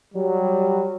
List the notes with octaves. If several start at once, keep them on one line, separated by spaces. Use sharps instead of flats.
F#3 G3